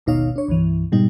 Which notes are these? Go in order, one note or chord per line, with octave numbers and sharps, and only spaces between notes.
G#1 D#2 B2 D#4 C#5 F5
D4 C#5
C2 G2 E3
G#2 B2 G3 D#4